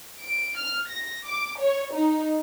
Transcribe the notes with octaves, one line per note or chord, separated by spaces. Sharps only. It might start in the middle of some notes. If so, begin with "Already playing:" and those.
D7
F6
A#6
D6
C#5
D#4